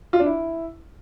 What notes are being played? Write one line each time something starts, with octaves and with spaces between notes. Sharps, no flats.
F4
D4
E4